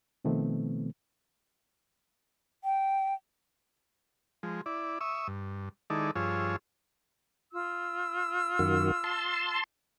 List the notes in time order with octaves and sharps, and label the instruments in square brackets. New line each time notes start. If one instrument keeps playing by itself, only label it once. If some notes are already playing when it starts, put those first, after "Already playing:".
[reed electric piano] B2 D#3 F3 A3 B3 C4
[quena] G5
[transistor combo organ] F3 G#3
E4 D5
E5 C#6 D#6 E6
G2
D#3 G#3 D#4 E4 A4 D5
G2 F3 F4 G#4 C#5 E6
[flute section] F4 E6
[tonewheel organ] F#2 D#3 F#4
A5 C6